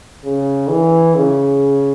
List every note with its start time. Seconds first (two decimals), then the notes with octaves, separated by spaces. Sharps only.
0.24 C#3
0.69 E3
1.15 C#3